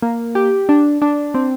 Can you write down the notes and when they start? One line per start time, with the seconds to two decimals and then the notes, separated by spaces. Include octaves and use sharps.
0.02 A#3
0.35 G4
0.69 D4
1.02 D4
1.34 C4